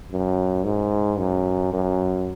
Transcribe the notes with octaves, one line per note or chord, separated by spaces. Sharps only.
F#2
G#2
F#2
F#2